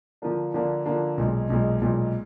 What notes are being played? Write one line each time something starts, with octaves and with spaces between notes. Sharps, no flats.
D3 F3 A#3 D4
D3 F3 A#3 D4
D3 F3 A#3 D4
B1 A#2 G#3
B1 A#2 G#3
B1 A#2 G#3